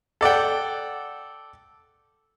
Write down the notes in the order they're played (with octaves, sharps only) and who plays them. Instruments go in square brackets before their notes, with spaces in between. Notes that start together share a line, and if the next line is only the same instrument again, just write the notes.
[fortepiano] A4 D5 F#5 G5